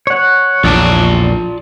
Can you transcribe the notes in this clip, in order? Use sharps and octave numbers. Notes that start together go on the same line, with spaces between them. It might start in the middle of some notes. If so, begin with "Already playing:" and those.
C#5 F#5
A#1 E2 A#2 F4 D5 A5